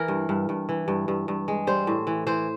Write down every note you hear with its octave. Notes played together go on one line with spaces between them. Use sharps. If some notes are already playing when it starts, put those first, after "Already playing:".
Already playing: E3 A#4
G2
G2
G2
E3
G2
G2
G2
G#3
G3 C5
A2
E3
E3 C5